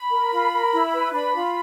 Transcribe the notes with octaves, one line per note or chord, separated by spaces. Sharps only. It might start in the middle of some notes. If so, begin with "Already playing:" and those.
Already playing: B5
A#4
F4
A#4
E4
B4
D4 B5
F4